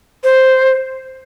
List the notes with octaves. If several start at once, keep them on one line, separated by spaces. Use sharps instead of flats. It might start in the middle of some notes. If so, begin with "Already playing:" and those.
C5